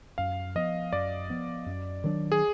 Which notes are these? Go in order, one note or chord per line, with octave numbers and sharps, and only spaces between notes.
F#2 F5
F3 B3 D#5
F#2 D5
F3 B3
F#2
D#3 F#3 D4
G#4